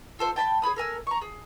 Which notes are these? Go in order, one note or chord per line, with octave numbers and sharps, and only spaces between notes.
F4 A4 C5
G5 A5 B5
G#4 C#5 B5 D#6
A4 A#4 G#5 E6
A#5 C#6
G#4